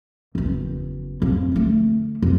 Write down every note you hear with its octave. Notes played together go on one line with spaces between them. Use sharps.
F#1 E2
F2
D3 A3
F2